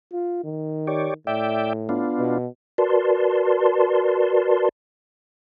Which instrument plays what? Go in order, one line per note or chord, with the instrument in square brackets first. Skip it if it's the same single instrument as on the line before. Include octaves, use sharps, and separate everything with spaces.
[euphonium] F4
D#3
[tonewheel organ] G4 C#5 D5
[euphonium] A2 [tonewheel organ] D5 E5 G5
[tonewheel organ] B3 D4 F4
[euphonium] B2
[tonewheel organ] F#4 A#4 B4 D5 A5 C6